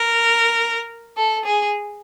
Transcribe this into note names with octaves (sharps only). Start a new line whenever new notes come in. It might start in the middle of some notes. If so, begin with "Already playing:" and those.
Already playing: A#4
A4
G#4